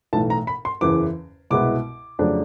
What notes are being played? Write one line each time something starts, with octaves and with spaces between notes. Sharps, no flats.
B1 A2 E3 A3 A5
A#5
B5
C6
F#1 E2 C#3 E3 D6
C2 B2 G#3 B3 E4 D6
F2 C#3 F#3 A3 D4